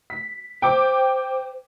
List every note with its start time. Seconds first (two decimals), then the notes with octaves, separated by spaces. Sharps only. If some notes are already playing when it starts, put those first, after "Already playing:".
0.10 B6
0.62 C5 G5 D6